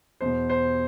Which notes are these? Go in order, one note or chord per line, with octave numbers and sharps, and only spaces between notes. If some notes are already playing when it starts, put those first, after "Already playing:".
E2 B2 C5
C5